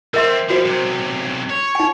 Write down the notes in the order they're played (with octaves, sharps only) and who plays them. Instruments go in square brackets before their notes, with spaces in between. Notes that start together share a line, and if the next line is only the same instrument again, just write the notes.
[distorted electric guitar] F3 C4 [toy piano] A#4 E5 C6
[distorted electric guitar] F3 G3 [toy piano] F#4 C5
[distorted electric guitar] B1 C3
C#5
[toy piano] D#4 G#5